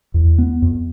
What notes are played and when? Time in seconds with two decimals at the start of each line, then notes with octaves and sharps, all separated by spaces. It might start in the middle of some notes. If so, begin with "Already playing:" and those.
0.14 E2
0.38 B3
0.62 F2